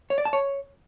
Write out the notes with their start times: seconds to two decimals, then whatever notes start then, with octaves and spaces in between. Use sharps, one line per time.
0.10 C#5
0.18 D5
0.25 A5
0.33 C#5